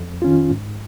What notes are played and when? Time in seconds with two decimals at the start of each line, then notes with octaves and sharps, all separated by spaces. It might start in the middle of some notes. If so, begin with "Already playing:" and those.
Already playing: F2
0.22 D#3 C#4 F4
0.50 G#2